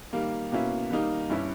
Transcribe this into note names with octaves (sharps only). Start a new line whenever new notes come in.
D#3 G3 A#3
B2 A#3 C#4 E4
D#3 G3 A#3 D#4
G2 G3 C#4 E4